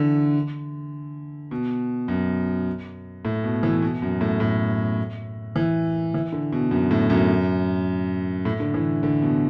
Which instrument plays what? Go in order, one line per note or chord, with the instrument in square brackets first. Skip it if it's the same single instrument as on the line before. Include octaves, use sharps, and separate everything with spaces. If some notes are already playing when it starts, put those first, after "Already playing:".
Already playing: [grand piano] D3 E3
B2
F#2
A2
B2
E3
B2
F#2
A2
A2
E3
E3
D3
B2
F#2
A2
F#2
A2
D3
E3
D3
B2